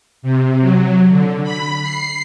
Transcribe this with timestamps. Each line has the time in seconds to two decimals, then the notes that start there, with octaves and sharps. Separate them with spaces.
0.22 C3
0.60 F#3
1.09 D3
1.43 B5
1.82 C7